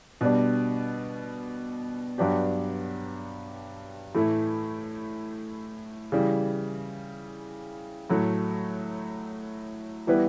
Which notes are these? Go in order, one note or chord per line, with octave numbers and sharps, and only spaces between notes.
B2 G3 D4
G2 F#3 B3 D4 G4
A2 E3 A3 E4
C#3 E3 G3
A2 F#3 A3
E3 G3 B3 E4 B4